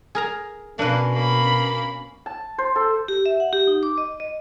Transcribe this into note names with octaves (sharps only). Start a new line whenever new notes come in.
G#4 A#4 A#5
B2 A#3 C#4 D4 B4
A#3 B5
A5
C5
A4
G4
E5
F#5
G4
D#4
D6
D#5
D#5